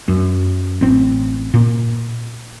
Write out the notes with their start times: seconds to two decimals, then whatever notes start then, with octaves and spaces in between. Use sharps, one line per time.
0.08 F#2
0.81 A1 C4
1.54 A#2